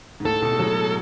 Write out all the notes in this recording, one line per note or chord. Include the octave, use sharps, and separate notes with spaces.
G#2
A2 A4
B2
G#3
F#3